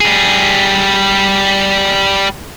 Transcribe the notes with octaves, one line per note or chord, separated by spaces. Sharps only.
G3 G#4